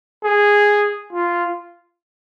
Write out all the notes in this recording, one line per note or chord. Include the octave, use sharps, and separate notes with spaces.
G#4
F4